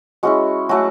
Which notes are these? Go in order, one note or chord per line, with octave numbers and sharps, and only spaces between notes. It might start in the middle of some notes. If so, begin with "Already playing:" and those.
G#3 C#4 E4 F#4
F#3 A3 C#4 F#4